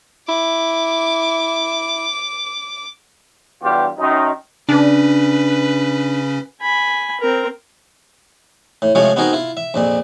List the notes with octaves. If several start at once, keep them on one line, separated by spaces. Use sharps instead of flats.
E4 D6
E2 G2 F#3 G3 F4 G4
F#2 D#3 D#4
C#3 C#4 D4 B4
G#5 B5
C4 A#4
A2
C3 F3 G#3 A3 F4 C#5
B3 C4 D#4 F#4 G#4 A#4
E4 F4
E5
A#1 F2 A#2